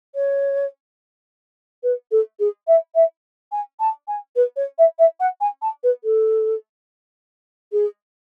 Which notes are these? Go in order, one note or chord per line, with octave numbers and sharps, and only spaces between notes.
C#5
B4
A4
G#4
E5
E5
G#5
A5
G#5
B4
C#5
E5
E5
F#5
G#5
A5
B4
A4
G#4